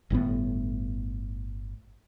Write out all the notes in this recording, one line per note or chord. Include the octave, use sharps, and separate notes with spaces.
G1 A2 C#3 B3